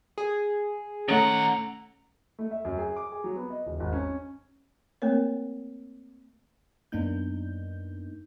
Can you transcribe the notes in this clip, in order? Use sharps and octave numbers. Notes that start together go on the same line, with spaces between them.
G#4
D#3 A3 C#4 F#5 A#5
A3
E5
F#2
G#4
D6
G#4
F#3
B3
D#5
E1
G#1
C#4
A3 A#3 C4 A#4 C#5
F#2 A#3 B3 D4 D#4 G6